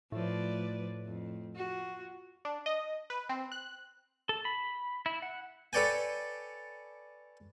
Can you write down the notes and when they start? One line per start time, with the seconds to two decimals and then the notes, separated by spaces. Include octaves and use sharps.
0.12 A2 F3 B4 D5
1.06 F2
1.54 F4 F#4
2.45 D4
2.66 D#5
3.10 B4
3.29 C4
3.52 F#6
4.29 A4
4.45 B5
5.06 E4
5.22 F#5
5.73 A4 B4 C#5 D5 G5 G#5